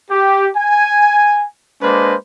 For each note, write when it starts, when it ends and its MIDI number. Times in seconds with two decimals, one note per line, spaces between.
0.11 0.49 67
0.57 1.45 80
1.82 2.16 56
1.82 2.16 58
1.82 2.16 62
1.82 2.16 71
1.82 2.16 72